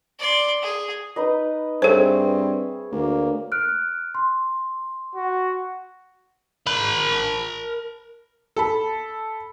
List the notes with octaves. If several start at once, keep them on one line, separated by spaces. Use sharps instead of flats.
D5 C6
G#4
D#4 B4 D#5
G2 C4 G#4 A4 C5 C#5 E5
D2 A#3
F6 F#6 D7
C6
F#4
A#4 B5
A4 A5 B5